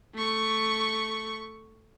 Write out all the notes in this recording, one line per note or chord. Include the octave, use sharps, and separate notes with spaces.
A3 C#6